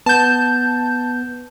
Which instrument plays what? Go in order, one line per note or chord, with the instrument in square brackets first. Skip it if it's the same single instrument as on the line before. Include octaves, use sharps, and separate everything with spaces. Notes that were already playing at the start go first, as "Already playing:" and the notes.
[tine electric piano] B3 [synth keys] A5 G6